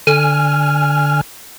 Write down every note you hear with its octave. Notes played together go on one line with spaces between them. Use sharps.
D3 G#5 F6